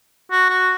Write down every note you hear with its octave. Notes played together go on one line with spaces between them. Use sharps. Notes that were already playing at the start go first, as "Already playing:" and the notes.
F#4
F#4